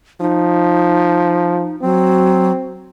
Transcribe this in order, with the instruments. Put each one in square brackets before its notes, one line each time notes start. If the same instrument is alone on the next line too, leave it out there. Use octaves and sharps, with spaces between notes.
[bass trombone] F3 [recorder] D#4
[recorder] F#3 [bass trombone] C4